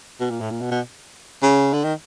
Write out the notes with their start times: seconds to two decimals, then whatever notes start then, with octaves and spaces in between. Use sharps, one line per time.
0.20 B2
0.30 A#2
0.41 A2
0.51 A#2
0.61 B2
0.71 B2
1.42 C#3
1.73 D3
1.84 D#3